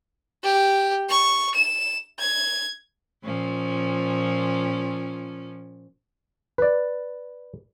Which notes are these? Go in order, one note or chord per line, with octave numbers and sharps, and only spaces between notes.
G4
C#6
E7
G#6
A#2 F3 C#4
B4 D5